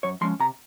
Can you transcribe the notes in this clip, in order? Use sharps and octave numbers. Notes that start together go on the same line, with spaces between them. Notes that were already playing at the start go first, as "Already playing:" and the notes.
F#2 C#5
F3 G#3 C#4 C6
C3 A#5